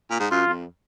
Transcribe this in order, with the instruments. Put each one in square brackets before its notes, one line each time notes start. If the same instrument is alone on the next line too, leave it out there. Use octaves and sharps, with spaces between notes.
[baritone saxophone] A#2
G#2
[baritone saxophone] F#2 [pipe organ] F4
[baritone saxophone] F2